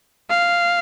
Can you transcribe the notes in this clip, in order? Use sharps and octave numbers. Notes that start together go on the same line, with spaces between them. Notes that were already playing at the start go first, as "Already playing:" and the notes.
F5